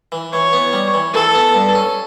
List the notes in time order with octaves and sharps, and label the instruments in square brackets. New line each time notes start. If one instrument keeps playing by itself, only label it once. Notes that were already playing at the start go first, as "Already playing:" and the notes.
[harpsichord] E3
[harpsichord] E3 [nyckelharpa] C#5
[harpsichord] B3
G3
E3
[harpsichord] E3 [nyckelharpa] A4
[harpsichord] B3
G2
C#4